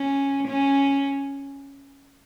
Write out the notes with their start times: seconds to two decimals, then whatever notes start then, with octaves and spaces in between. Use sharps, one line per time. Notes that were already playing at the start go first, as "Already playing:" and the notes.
Already playing: C#4
0.47 C#4